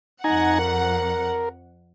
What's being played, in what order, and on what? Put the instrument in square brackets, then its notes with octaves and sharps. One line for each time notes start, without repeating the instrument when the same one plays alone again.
[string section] F2 F#5 [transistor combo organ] D#4 G#5 A#5
[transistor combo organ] A#4